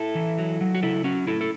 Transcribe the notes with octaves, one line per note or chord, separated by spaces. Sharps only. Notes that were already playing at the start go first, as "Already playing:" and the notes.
Already playing: E4 A4
E3
F#3
F#3
F#4
C#3 E4 A4
F#3 C#4 F#4
A2 E4 A4
A4